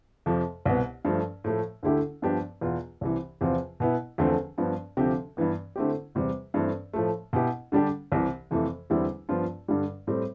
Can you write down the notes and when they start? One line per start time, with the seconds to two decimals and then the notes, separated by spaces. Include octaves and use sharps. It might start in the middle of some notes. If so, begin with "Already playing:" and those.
0.26 F2 C3 F3
0.65 C2 B2 B3
1.05 G2 F3 A3
1.44 A2 F3 A3
1.83 D2 D3 A3 E4 G4
2.22 G2 F3 B3 D4 G4
2.61 E2 B2 B3 F4
3.01 C2 C3 E3
3.41 E2 C3 F3 C4 F4
3.80 B2 B3 E4
4.18 E2 D3 F3 A3 C4
4.58 G2 F3 B3
4.97 D2 C3 F3 C4 G4
5.37 G2 E3 B3
5.76 D3 A3 C4 E4 G4
6.15 E2 C3 G3 C4
6.54 G2 E3 A3 C4
6.93 A2 F3 A3
7.33 B2 B3 E4 G4
7.72 D3 G3 D4 G4
8.12 C2 C3 E3
8.51 F2 C3 E3 A3
8.90 E2 D3 G3 C4 E4
9.29 G2 F3 B3 F4
9.68 G2 D3 G3
10.07 A2 G3 C4